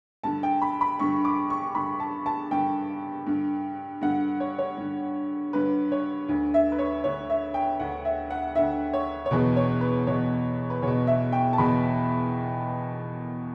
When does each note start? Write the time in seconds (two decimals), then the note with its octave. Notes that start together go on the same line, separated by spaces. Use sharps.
0.23 G2 D3 A5
0.43 G5
0.62 B5
0.81 B5
0.99 G2 D3 C#6
1.25 D6
1.50 C#6
1.75 G2 D3 B5
2.00 A5
2.26 A5
2.51 G2 D3 G5
3.27 G2 D3
4.01 G2 D3 F#5
4.40 C#5
4.58 C#5
4.77 G2 D3
5.53 G2 D3 B4
5.92 C#5
6.28 D2 D3
6.54 E5
6.72 B4
6.79 C#5
7.04 D2 D3 C#5
7.30 E5
7.54 G5
7.80 D2 D3 F#5
8.05 E5
8.30 F#5
8.55 D2 D3 E5
8.93 C#5
9.26 C#5
9.31 E2 B2 B4
9.56 C#5
9.81 B4
10.07 E2 B2 C#5
10.70 B4
10.82 E2 B2 C#5
11.07 E5
11.32 G5
11.53 A5
11.58 E2 B2 B5